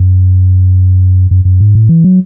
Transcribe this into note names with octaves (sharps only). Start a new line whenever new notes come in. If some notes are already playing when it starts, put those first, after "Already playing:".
Already playing: F#2
F#2
F#2
G#2
A2
E3
F#3